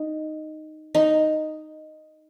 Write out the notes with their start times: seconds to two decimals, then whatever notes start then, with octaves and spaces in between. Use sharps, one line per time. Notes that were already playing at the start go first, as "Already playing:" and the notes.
Already playing: D#4
0.95 D#4